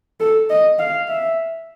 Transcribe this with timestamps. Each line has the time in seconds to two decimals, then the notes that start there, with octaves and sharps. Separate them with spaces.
0.20 A4
0.50 D#5
0.79 F5
1.08 E5